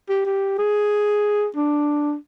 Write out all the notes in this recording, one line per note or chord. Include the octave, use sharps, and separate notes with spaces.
G4
G4
G#4
D4